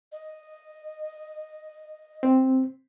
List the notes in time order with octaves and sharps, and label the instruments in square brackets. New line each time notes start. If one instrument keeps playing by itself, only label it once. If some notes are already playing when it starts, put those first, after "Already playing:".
[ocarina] D#5
[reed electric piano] C4